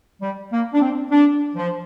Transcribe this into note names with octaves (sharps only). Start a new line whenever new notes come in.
G3
A#3
D4
C4
D4
F3